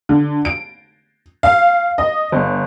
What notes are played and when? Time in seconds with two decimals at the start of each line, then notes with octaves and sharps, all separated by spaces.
0.09 D3
0.45 D7
1.43 F5
1.98 D#5
2.32 G1